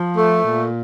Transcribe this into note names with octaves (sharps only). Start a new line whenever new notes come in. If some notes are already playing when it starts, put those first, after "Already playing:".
Already playing: F3
A3
A#2